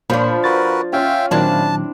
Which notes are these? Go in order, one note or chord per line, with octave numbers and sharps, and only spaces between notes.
A#2 F3 D4 F4 C5 B5
F#4 A#4 B4 A6
C#4 F4 E5 F5 G5
A#2 D#3 F#3 C4 D4 E4 A5